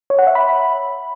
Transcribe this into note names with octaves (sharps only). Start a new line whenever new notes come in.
C#5
F#5
E5
B5